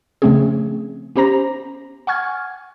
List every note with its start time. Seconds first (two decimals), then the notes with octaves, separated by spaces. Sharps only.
0.22 C#3 F3 A3 C4 C#4 G#4
1.16 B3 C#4 G4 C5 A#5 A#6
2.07 F#5 G#5 C#6 F6 G#6